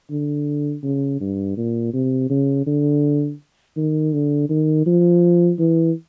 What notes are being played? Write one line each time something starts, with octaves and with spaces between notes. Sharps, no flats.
D3
C#3
G2
A#2
C3
C#3
D3
D#3
D3
D#3
F3
E3